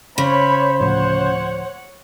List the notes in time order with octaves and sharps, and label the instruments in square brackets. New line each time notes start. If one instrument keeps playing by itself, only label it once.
[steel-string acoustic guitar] C#3 [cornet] C5 [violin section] C#5 B5
[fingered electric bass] D2 A2 F3 [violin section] C#5 F#5